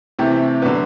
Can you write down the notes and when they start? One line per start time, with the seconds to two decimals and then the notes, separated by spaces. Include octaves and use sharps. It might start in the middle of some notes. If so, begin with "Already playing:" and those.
0.19 C3 E3 A3 G4
0.62 D3 F#3 B3